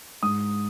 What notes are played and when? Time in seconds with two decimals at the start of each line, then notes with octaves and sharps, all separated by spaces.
0.23 G#2 D#6